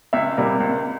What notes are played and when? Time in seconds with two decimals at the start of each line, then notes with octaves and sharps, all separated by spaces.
0.13 C#2 E5
0.37 C3 G3 A#3
0.60 C#2